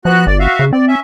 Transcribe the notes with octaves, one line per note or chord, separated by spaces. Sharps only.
F3 B3 F#4 F#6
G1 D5
F#4 E5 F5
C#3
C4 D5
C#4 E5